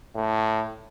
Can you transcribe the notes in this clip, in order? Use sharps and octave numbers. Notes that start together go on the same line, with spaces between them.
A2